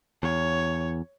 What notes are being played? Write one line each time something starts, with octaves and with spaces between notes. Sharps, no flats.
E2 C#5